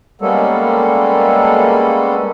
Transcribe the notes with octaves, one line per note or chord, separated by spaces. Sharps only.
G3 G#3 A#3 B3 C#4 A4